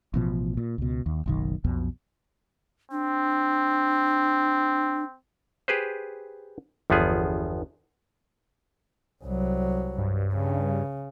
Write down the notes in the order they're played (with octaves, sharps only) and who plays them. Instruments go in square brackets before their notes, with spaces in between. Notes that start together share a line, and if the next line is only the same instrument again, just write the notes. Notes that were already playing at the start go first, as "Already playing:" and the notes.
[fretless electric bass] A1 B2 F3
A#2
C#2 B2
D#2
F#1 B1 D#3
B1 F2 B2
[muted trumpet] C4 [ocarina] D4
[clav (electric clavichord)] G4 G#4 B4 C5
G1 E2 F3 B3 G#4
[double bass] C2 F#3
[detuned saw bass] G2
[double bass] C#3